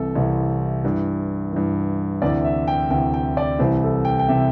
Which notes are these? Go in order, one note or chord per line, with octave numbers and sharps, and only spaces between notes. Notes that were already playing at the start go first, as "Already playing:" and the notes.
Already playing: C2 C3 E3 A4
C2 C3 E3
G2 E3
G2 E3
D2 C3 E3 D5
E5
G5
D2 C3 E3 G5
G5
D5
C2 C3 E3 C5
A4
G5
G5
C3 E3 E5